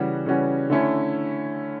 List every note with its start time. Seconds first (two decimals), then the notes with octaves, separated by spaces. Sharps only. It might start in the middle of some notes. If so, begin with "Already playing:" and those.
Already playing: C#3 E3 G3 C#4 F#4
0.26 C#3 E3 G3 C#4 F#4
0.70 D3 A3 C#4 E4